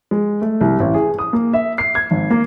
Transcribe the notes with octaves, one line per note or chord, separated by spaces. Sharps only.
G#3
A3
C2
A1
G#4
D#6
A#3
E5
C7
G#6
G#1
A#3